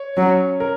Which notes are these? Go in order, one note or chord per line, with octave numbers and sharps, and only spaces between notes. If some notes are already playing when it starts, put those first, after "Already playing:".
Already playing: C#5
F#3 C#4
A#4